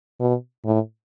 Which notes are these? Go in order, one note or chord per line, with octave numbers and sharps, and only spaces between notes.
B2
A2